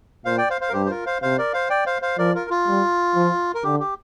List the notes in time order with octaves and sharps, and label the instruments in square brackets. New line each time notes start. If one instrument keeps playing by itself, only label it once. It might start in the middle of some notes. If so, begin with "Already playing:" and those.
[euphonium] A#2 [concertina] C5 F5
[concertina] D5 G5
C5 F5
C5 F5
A#4
[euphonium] G2 [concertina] G4 C5
[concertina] C5
F4 A#4
C5 F5
[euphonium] C3 [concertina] C5 F5
[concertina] A#4 D5
C5 F5
D5 G5
C5 F5
C5 F5
[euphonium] F3 [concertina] A#4 D5
[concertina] F4 A#4
F4
[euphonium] G3
F3
[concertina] A#4
[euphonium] D3 [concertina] G4
[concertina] G4